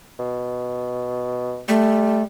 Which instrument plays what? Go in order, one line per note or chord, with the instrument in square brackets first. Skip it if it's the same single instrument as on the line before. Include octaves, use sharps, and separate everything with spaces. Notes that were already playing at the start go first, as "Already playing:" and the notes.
[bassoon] B2
[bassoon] G3 [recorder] A3